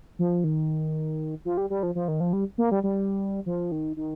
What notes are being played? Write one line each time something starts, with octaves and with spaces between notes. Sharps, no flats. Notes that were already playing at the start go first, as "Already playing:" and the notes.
F3
D#3
F3
G3
G3
F3
F3
D#3
F3
G3
A#3
G3
G3
F3
D#3
D#3